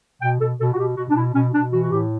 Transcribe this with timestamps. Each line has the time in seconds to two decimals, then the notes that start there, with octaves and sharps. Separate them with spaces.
0.21 B2 G5
0.40 B2 A4
0.59 B2 A4
0.74 F#4
0.78 B2 G4
0.97 B2 F#4
1.09 D4
1.15 B2 E4
1.34 B2 C#4
1.53 B2 D4
1.72 E3 F#4
1.82 F#4
1.91 A2 G4